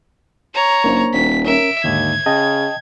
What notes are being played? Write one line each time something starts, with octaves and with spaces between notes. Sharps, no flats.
C#5 A#5
F#1 A#3 D4 C5
D#1 B6
C#4 A#4 E5 D7
D#2 G#2 D3 G#6
C#3 D#5 G5 A5